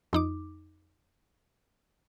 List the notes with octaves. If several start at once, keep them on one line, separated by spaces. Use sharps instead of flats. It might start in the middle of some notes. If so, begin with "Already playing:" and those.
F2 D#4 D6